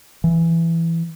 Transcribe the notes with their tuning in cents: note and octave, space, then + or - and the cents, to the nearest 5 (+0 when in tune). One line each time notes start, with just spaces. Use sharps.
E3 +10